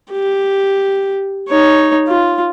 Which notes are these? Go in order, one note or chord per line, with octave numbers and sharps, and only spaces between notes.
G4
D#4 C#5
F4